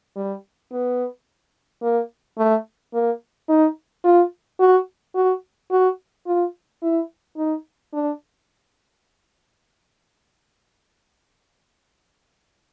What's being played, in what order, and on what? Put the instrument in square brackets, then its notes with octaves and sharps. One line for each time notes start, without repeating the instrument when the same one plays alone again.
[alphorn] G3
B3
A#3
A3
A#3
D#4
F4
F#4
F#4
F#4
F4
E4
D#4
D4